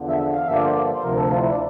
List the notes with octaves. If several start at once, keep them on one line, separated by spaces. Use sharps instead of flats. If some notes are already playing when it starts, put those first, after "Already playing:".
Already playing: E2 D3 F3
E5
F5
G2 D3 F3 A#3 E5
D5
C5
D5
C5
D2 C3 F3 A#4
A4
D4 F4
E4
D4